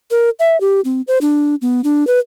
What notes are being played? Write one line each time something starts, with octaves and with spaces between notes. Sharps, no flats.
A#4
E5
G4
C4
C5
D4
B3
D4
B4